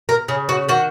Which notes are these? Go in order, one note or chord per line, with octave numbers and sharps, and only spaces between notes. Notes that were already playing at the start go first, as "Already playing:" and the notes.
A#4
C#3 G#4
F#4
D#3 F#4